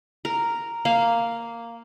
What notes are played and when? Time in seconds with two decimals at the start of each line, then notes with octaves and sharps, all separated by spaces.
0.25 A#4
0.85 A#3 F5